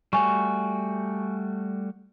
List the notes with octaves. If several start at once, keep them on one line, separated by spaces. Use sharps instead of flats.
G3 A3 F#4 G#5 C#6